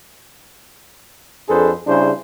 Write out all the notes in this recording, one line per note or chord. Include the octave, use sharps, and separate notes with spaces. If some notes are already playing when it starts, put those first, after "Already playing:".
F2 D4 G#4 A4 B4 C5
C#3 G3 D4 E4 G#4 C5